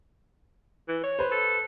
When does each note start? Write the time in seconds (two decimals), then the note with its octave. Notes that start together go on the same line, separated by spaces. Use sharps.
0.89 E3
1.04 C#5
1.19 B4 C5
1.32 A4